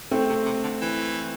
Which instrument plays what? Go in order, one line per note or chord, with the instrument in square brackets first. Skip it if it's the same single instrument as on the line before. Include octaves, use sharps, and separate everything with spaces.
[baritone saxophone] B2 [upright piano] A3 C4
[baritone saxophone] C3
C3
D3
E3